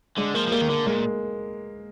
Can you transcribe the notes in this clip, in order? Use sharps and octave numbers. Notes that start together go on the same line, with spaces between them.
D3 G#3
F3 A#3
F3
G3 A#3
D#3
D3 A#3
A#2 G#3